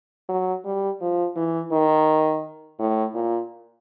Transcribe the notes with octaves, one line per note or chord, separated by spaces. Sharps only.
F#3
G3
F3
E3
D#3
A2
A#2